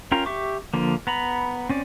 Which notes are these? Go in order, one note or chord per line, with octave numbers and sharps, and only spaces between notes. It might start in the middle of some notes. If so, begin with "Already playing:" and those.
C#4 F4 A#4 G5 A#5
G4 E5 C#6 D6
D3 F3 A#3
B3 A#5 B5
C4 C#4 D5